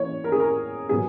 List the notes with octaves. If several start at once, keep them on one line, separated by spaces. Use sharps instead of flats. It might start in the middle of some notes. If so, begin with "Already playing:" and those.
Already playing: E3 A#3 C#4 C#5
A#4
G#4
A#4
B2 F#3 B3 G#4